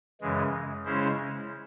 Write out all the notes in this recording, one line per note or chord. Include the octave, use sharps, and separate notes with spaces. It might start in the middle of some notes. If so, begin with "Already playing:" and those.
F#2 C#3 E3 G#3
C#3 G#3 C#4 E4 C5